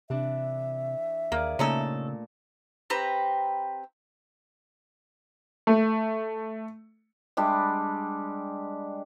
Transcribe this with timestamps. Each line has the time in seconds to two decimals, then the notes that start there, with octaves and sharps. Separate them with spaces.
0.10 C3 E3 D4 E5
1.32 D#2 A#3 G#4 D5
1.59 A#2 C#3 A3 C#4 D#4 A4 A5
2.90 C4 G4 B4 A#5
5.67 A3
7.37 G3 G#3 D4 G4